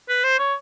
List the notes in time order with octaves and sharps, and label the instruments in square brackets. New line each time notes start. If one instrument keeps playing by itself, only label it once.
[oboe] B4
C5
C#5